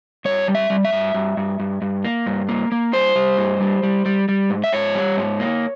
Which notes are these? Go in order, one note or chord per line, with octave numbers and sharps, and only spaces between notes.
G2 C#5
G3
E5
G3
E5
G2
G2
G2
G2
G2
A#3
G2
A#3
A#3
G3 C5
G3
G2
G3
G3
G3
G3
G#2
E5
G#2 C#5
G3
G#2
A#3